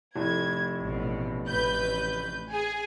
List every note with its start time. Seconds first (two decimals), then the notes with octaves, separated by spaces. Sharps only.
0.16 F1 A2 G#6
0.81 A1 B2
1.47 A1 B4 G6
2.51 G#4 G#5